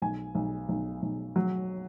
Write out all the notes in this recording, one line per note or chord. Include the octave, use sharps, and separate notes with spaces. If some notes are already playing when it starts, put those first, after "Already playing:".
B1 G#5
B1
B1
B1
F#3